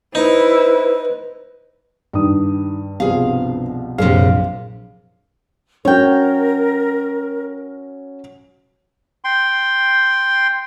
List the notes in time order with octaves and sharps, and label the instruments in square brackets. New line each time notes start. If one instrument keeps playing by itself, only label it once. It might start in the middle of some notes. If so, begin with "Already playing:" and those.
[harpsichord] D#4 [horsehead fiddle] E4 [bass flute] B4 [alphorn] C5
[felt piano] G2 [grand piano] D#3 D#6
[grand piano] C2 B2 F3 [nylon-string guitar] G#4 F5
[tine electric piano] A#1 F5 [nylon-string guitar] F#2 A2 C3 [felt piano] G#4
[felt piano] F#3 C#4 [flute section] A#4 [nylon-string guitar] C#5 G5
[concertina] G5 C6